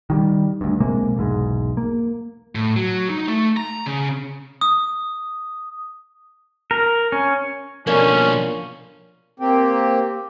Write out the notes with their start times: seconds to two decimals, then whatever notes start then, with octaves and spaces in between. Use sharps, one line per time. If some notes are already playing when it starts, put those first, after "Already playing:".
0.10 D#3 F#3 G3
0.61 D2 G2
0.80 B1 C3 G#3 A#3
1.16 B1 E2 G#2 G#3
1.77 A#3
2.55 A2
2.76 F#3
3.10 D#4
3.27 A3
3.57 A#5
3.86 C#3
4.61 D#6
6.71 A#4
7.12 C#4
7.87 B2 F3 A#3 C#4 D4
9.40 A#3 C4 G4